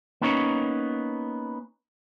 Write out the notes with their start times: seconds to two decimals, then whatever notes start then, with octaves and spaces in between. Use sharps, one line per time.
0.21 A#3 B3 C#4 D#4 C#5